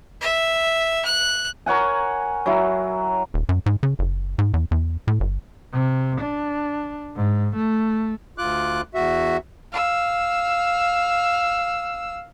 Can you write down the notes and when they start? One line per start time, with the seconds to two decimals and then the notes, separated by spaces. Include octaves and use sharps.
0.21 E5
1.05 F#6
1.66 A#4 C#5 F#5 G#5
2.46 F#3 E4
3.34 D#1
3.49 F#2
3.66 G#2
3.83 C#3
3.99 F#1
4.38 G#2
4.54 E2
4.71 E2
5.07 A2
5.20 G1
5.73 C3
6.21 D4
7.16 G#2
7.55 A3
8.38 D2 F4 D6 F#6
8.94 E2 F#4 E5
9.72 F5 E6